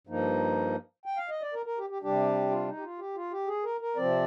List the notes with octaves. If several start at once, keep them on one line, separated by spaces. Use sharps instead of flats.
G2 F3 A#3 D#4
G5
F5
D#5
D5
A#4
A#4
G4
G4
C3 G3 D4 G4
F4
D#4
G4
F4
G4
F4
G4
G#4
A#4
A#4
C3 F3 C4 D5